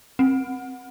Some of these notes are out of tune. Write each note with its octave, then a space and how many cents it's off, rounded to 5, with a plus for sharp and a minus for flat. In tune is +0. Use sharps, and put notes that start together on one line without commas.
C4 +20